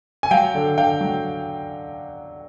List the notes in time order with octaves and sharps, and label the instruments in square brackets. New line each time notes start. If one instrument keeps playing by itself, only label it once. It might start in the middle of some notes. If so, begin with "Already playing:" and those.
[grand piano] G#5
F#3 F5 G5
D3
D3 F5 G5
F#3